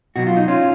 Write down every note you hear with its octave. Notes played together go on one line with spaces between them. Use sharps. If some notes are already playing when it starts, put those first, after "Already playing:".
B2 F#3 F#4
F4
D#4
C#4 F4